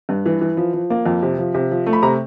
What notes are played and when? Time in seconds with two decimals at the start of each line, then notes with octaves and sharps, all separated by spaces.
0.09 G2
0.26 E3
0.41 E3
0.57 F3
0.73 F3
0.90 A#3
1.06 F2
1.23 C3
1.39 F3
1.54 C3
1.71 F3
1.86 A3
1.93 B5
2.03 C3 A#5